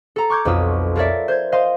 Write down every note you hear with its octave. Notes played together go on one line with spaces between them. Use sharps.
A4 A#5
C#6 D6 F6 G6 G#6
B1 F2 F#3 F4 D#6 E6
F4 A4 A#4 C#5 D5 E5
C5 G6 G#6
C5 D#5 F5 C6